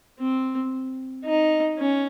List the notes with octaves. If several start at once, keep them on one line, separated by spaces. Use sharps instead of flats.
C4
D#4
C#4